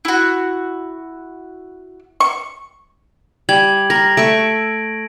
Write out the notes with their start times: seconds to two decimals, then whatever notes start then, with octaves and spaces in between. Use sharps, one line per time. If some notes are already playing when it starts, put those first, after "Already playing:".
0.05 E4 F#4
2.20 C#6
3.49 G3 G#6 F#7
3.90 A#4 A#6
4.17 A3 E5 C#6 D7